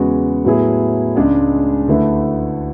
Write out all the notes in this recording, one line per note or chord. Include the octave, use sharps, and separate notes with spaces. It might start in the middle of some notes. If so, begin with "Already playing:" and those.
Already playing: E2 C#3 G#3 B3 F#4
A2 F#3 B3 E4 G#4
C#2 C#3 G#3 D4 G#4
D2 D3 A3 E4 B4